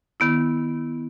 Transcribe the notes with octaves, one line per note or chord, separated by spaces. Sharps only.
D#3 B3 E4